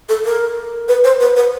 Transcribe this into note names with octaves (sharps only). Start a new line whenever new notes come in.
A4
A#4
B4
C5
B4
B4